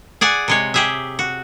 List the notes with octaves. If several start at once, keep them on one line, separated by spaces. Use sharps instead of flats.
G#4 D5 F#5 G#5
C3 G#3 C#5
G4 G#4 E5
F#4